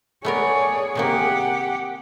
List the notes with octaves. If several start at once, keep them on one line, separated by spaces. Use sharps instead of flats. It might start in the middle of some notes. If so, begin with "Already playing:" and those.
A3 B3 G#4 A#4 C#5 D5
C3 D#3 A#3 G4 F#5